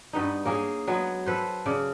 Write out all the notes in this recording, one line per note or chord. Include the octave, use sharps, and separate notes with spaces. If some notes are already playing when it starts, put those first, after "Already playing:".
G2 B3 D#4
A#3 C#4 G#4
F#3 G#3 B3
A4 B4 C5
C#3 D5